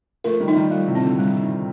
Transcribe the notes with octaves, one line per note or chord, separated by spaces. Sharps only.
F3 A3 A#4
D#3 G3
D#4
D#3 G3
F3 G3 A3
A2 C3
C4
A#2 D3
G3
D#4